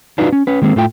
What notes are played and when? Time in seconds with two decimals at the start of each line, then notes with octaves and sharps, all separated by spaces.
0.18 D4 D#4 F4 F#4 B4
0.32 C#4
0.47 C#4 B4
0.62 D#3 G#3 A#3 C4
0.76 A2 A3 F4 G5